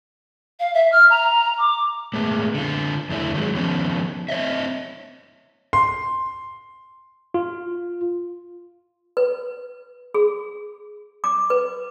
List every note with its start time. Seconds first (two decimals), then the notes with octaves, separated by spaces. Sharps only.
0.60 F5
0.74 E5
0.92 F6
1.10 A#5
1.58 D6
2.13 A#2 G#3 A3 B3
2.54 D3 F4
3.09 E2 D3 A3 E4 D5
3.34 D#3 F#3 G#3
3.55 D#3 F3 B3 C#4 D#4
4.28 C4 C#5 D#5 E5
5.73 C6
7.34 F4
9.17 B4
10.14 G#4
11.24 D6
11.50 B4